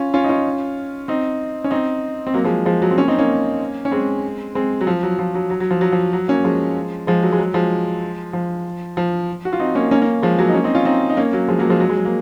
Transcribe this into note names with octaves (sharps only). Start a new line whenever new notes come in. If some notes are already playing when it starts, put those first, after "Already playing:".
Already playing: C#4 F4
C#4 F4
D#4
C#4 F4
C4 D#4
C#4
C4 D#4
C4
F#3 A#3
F3 G#3
F3 G#3
F#3
C4
A#3 C#4
C4 D#4
A#3 C#4
C#4
G#3 C4
G#3 C4
F#3
F3
F#3
F3
F#3
F#3
F#3
F3
F#3
F3
F#3
A#3 C#4
F3 G#3
F3 G#3
F#3
G#3
F#3
F3 G#3
F3
F3
F#4
F4
C4 D#4
A#3 C#4
A#3 C#4
A#3 C#4
F3 G#3
F#3 A#3
D#4
A#3 C#4
C4 D#4
C#4 F4
C4 D#4
D#4
A#3 C#4
F#3 A#3
F3 G#3
F#3 A#3
F3 G#3
F#3
G#3
F#3
A#3